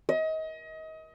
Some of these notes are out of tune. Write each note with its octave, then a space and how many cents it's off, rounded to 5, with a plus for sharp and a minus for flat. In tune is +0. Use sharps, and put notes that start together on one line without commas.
D#5 +30